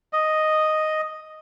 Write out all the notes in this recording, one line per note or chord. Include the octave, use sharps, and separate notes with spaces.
D#5